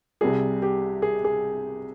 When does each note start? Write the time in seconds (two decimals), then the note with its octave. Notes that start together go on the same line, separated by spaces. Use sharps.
0.21 C2 C3 G3 G#4
0.62 G4
1.02 G#4
1.24 G#4